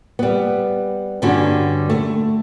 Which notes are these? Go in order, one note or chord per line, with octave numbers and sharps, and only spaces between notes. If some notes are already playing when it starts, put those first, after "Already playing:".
G3 B3
G2 D3 G3 C#4 F#4
A3